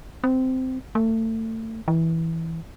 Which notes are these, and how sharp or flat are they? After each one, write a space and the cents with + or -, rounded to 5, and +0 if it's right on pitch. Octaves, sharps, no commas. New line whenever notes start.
C4 -15
A3 +30
E3 -10